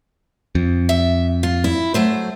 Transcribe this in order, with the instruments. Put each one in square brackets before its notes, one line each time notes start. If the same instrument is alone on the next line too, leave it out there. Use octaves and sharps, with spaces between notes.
[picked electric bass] F2
[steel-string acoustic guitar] E5
F4
E4
F#3 A3 C5